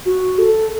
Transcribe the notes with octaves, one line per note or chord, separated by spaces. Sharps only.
F#4
A4